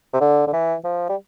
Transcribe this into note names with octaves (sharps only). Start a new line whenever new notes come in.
C3
D3
D3
E3
F3
G3